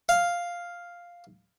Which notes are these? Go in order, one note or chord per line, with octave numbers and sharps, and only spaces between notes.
F5